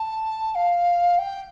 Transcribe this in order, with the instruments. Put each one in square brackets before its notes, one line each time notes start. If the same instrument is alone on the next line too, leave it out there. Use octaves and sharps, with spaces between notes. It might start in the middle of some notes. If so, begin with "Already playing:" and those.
Already playing: [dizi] A5
F5
G5